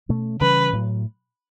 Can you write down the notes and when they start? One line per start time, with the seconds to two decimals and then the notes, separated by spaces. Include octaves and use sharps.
0.09 B2 A3 C#4
0.40 C#3 E3 G3 C#4 B4
0.73 A2 F#3